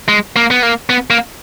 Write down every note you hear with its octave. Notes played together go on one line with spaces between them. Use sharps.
G#3
A#3
B3
A#3
B3
A#3